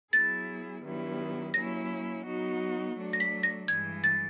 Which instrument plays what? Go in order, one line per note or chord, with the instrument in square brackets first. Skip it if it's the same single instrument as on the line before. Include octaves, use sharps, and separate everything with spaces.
[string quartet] F#3 B3 E4 G#4 [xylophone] A6
[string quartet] G2 D#3 F#3 B3 E4
[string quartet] F#3 A#3 C#4 E4 [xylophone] A#6
[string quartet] F#3 B3 D#4 F#4
F#3 A3 D4
[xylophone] A#6
B6
A#6
[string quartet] G2 E3 G#3 [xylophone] G#6
[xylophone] A6